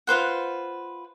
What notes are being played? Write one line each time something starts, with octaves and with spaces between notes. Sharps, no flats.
F4 B4 C5 F#5